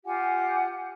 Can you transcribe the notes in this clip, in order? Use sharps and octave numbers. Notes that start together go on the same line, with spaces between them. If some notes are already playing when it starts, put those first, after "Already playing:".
F4 G4 F#5 G#5